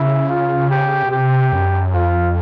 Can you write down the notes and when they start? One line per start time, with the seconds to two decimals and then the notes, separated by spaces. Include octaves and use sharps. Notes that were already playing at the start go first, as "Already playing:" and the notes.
Already playing: C#3 E4
0.29 F4
0.70 G4
1.03 B2
1.11 C3 G4
1.52 F#2
1.93 F2 F4